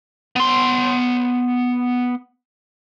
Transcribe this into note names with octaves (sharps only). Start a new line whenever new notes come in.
B3 C6